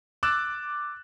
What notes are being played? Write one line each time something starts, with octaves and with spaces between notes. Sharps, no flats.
D6 E6 F#6 A6 E7